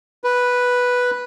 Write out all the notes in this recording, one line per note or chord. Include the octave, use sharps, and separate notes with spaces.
B4